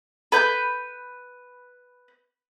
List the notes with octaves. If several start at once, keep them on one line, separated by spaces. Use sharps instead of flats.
B4 G6